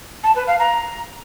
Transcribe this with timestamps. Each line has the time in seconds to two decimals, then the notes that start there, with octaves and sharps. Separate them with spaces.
0.23 A5
0.35 B4
0.47 F5
0.59 A#5